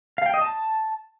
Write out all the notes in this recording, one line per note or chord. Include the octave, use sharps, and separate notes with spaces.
F5
G5
D#5
A5